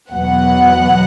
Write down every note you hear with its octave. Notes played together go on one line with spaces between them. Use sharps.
E2 B2 F#3 B3 F#5